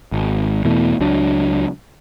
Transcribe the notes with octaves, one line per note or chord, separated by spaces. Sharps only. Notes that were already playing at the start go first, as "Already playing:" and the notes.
G#1
E2 B2 E3 A3
C#2 F#3 D4